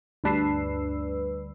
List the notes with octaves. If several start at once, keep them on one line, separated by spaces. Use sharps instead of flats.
D2 G2 D4 B4 E6 C7